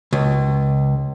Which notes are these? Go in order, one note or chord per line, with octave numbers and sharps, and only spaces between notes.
C#2